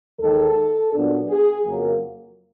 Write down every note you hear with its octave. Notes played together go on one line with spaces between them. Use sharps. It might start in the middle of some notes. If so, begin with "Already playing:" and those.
D#2 D#3 G#3 A4
A#2 F#3 B3 D4
G#4
F2 C#3 F#3 A#3